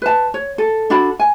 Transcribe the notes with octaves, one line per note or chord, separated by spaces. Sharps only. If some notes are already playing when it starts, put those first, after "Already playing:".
B4 A5
C#5
A4
D4 F#4 A4 B5
G#5